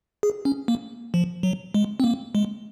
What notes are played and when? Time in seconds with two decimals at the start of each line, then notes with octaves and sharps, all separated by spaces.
0.23 G#4
0.45 C#4
0.68 A#3
1.14 F3
1.43 F#3
1.74 G#3
2.00 C4
2.04 A#3
2.35 G#3